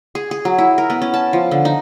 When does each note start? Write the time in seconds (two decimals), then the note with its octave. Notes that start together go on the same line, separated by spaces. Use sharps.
0.15 G#4
0.31 G#4
0.45 F#3
0.58 E4
0.78 A#4
0.90 B3
1.02 C#4
1.14 A5
1.33 F3
1.51 D3
1.65 D#4